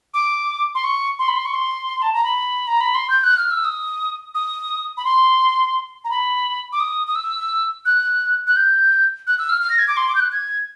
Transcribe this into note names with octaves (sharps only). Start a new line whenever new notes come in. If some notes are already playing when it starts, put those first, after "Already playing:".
D6
C6
C#6
C6
B5
C6
C#6
C6
A5
A#5
B5
A#5
B5
C6
G6
F#6
F6
E6
D#6
D#6
B5
C6
A#5
B5
D6
D#6
D#6
E6
F#6
F#6
G6
F#6
E6
F6
F6
A#6
G#6
D6
C6
D6
G6
F#6
G#6